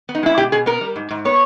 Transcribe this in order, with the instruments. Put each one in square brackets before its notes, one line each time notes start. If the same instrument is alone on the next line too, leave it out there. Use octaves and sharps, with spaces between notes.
[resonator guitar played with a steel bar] B3
D#4
G#3 E4
B2 G4
B2 G#4
B3 A#4
G3
G#2
G#2
B3 C#5